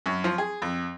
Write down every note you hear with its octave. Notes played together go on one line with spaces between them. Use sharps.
F#2
F3
G#4
F2